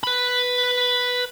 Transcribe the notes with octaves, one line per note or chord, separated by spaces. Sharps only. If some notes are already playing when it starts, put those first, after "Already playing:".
B4 B5